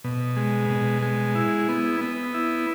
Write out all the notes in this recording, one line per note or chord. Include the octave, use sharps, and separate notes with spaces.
B2
G#3
B2
G#3
E4
B3
B3
E4